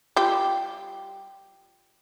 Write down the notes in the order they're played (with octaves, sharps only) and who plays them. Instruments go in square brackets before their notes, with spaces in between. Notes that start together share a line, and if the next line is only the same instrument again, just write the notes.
[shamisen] G3 F4 G4